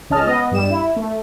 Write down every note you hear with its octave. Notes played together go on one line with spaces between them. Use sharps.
C#2 C#4 D#5 A5 F6
B3 D#5
G2 G3 E7
E4
A3